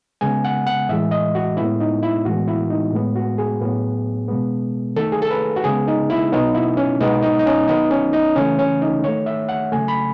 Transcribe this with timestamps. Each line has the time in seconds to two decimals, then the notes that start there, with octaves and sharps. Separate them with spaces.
0.21 C#3 G#3 B3 G#5
0.45 F#5
0.67 F#5
0.89 A2 E3 G#3 E5
1.11 D#5
1.35 F#4
1.57 A2 G#3 B3 E4
1.80 D#4
2.03 E4
2.25 A2 E3 G#3 B3 F#4
2.48 E4
2.70 D#4
2.93 A2 G#3 B3
3.15 F#4
3.38 G#4
3.61 A2 F#3 B3
4.28 B2 G#3 B3
4.96 D#3 A3 A4
5.12 G#4
5.22 A4
5.30 B4
5.56 F#4
5.64 C#3 G#3 B3 G#4
5.88 D#4
6.10 E4
6.32 B2 F#3 B3 D#4
6.55 E4
6.77 C#4
7.01 B2 G#3 B3 D#4
7.23 D#4
7.39 D#4
7.46 C#4
7.68 D#3 F#3 B3 D#4
7.91 C#4
8.13 D#4
8.36 C#3 E3 A3 C#4
8.59 C#4
8.82 D#4
9.04 D#3 A3 C#5
9.26 E5
9.49 F#5
9.72 C#3 F#3 A3 G#5
9.88 B5